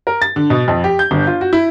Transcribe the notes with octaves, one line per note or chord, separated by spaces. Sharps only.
A#4
A6
D3
B2
F2
G4
G6
G1
F4
F#4
E4